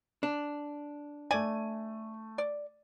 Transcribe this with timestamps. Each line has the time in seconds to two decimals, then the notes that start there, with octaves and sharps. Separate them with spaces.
0.23 D4
1.31 A3 D5 G#5 D#7
2.38 D5